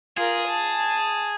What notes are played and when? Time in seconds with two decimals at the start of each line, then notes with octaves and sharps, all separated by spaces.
0.17 F4 G#4 A#4
0.48 A5